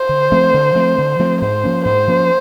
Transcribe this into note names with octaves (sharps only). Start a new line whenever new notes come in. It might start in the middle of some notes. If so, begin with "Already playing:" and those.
Already playing: C5
D3
F3 A3 C4
D3
F3 A3 C4
D3
F3 A3 C4
G#2 C5
F3 A#3 C#4
G#2 C5
F3 A#3 C#4